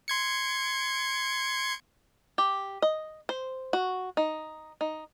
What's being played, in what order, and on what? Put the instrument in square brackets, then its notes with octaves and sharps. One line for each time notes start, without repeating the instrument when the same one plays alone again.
[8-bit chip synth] C6 G#6 C#7
[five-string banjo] G4
D#5
C5
F#4
D#4
D#4